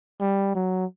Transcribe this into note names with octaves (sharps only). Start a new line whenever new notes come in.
G3
F#3